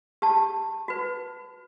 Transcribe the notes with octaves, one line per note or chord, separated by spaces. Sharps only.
G4 A5
F#4 B4